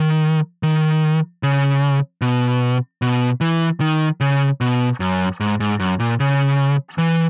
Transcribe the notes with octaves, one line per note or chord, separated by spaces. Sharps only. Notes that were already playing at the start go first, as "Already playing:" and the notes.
Already playing: D#3
D#3
C#3
B2
B2
E3
D#3
C#3
B2
F#2
G#2
G#2
F#2
A#2
C#3
E3